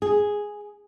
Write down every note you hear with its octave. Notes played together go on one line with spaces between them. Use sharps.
G#4